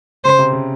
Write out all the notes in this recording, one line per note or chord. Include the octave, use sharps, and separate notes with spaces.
C#3 C5
C3
C#3